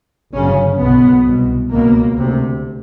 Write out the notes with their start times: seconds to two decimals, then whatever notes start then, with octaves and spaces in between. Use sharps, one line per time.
0.33 G1 F#2 C#3 C#4
0.80 B1 B2 B3
1.26 C2 B2
1.71 C#2 B2 A#3
2.18 D2 C3